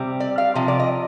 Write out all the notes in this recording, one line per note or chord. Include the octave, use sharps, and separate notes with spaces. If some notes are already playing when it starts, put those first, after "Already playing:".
Already playing: C3 G3 C4
D5
F5
C3 F3
D5
D#5